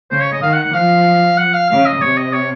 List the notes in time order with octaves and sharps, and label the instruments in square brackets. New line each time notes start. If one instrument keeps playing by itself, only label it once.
[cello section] C#3 [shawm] C5
[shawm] C#5
D#5
[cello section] D#3 [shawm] F5
[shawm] F#5
F#5
[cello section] F3 [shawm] F5
[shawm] F#5
F5
[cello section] C#3 [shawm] F5
[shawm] D#5
[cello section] C3 [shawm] C#5
[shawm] D#5
C#5